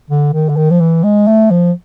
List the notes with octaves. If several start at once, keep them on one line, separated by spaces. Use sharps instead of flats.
D3
D#3
D3
D#3
F3
E3
G#3
A3
F3